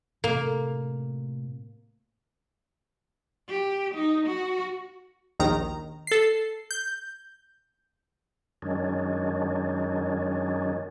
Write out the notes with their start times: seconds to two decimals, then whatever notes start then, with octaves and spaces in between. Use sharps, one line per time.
0.24 A2 C3 A#3
3.49 G4
3.94 D#4
4.27 F#4
5.40 A#1 D#2 D#3 A#5
6.07 A4 C7
6.71 G6
8.62 F#2 D#3 F#3 G#3 C#4 D4